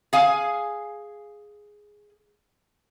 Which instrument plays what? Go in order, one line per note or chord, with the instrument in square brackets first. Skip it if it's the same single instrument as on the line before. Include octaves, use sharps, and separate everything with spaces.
[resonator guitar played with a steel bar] G#4 F5 G#5